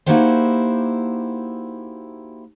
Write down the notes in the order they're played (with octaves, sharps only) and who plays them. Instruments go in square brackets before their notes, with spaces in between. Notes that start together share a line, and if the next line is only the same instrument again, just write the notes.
[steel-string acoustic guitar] A#3 D#4 E4 F#4 G4 C5